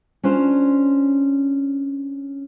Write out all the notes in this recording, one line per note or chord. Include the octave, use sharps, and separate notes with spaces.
C#4 D4 F4 C5